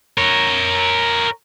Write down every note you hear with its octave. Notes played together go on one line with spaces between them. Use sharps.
A#4 C#5